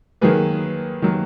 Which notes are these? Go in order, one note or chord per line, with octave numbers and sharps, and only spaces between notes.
D#3 F#3 A#3 G#4 B4
D#3 F#3 A#3